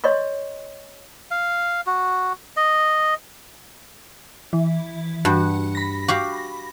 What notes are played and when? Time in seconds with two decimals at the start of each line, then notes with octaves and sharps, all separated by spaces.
0.04 C#5 D#5 C6 C#6
1.31 F5
1.87 F#4
2.57 D#5
4.53 E3
5.25 G2 F#4
5.75 B5 A#6
6.08 F#4 G4 F5